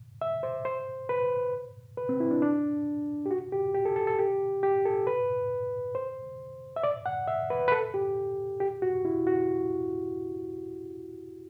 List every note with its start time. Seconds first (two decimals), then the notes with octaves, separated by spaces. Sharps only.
0.21 E5
0.43 C5
0.65 C5
1.09 B4
1.97 B4
2.09 C4
2.20 E4
2.31 D4
2.42 D4
3.26 G4
3.31 F#4
3.52 G4
3.74 G4
3.85 A4
3.96 A4
4.07 A4
4.19 G4
4.63 G4
4.85 A4
5.07 B4
5.95 C5
6.76 E5
6.83 D5
7.06 F#5
7.28 E5
7.50 B4
7.68 B4
7.72 A4
7.94 G4
8.60 G4
8.82 F#4
9.05 E4
9.27 F#4